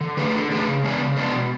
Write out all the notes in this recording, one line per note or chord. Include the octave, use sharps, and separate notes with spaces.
D3
A3 D4 G#4 B4
D3
A3 D4 G#4 B4
C#3
G#3 B3 D4
C#3
G#3 B3 D4
B2